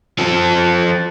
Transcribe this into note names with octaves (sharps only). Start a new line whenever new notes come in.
F3 A4